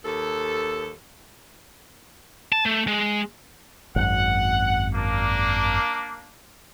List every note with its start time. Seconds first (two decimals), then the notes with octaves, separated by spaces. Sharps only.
0.05 D#2 A4
2.52 A5
2.66 A3
2.87 G#3
3.96 G#1 F#2 F#5
4.93 A#3 D4